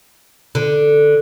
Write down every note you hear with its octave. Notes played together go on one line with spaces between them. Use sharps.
D3